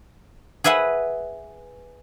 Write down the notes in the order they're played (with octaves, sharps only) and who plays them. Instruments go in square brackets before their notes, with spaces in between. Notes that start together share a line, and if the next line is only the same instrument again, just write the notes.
[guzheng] G#4 B4 E5 F#5 G#5